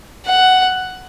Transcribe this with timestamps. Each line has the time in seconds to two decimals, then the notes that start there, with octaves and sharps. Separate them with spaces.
0.25 F#5